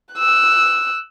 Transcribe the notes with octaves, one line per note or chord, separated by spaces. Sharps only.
E6 F#6